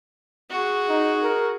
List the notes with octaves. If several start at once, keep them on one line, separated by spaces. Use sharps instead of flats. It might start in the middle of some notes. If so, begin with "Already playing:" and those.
F#4 G#4
D#4
A#4